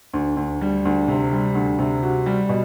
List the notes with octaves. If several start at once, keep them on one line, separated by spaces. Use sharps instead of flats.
D2
D2
G3
D2
C3
G3
D2
C3
F#4
G3
B2